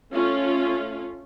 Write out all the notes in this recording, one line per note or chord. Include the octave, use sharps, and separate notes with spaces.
A3 C#4 F4